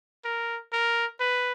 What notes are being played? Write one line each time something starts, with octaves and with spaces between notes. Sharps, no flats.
A#4
A#4
B4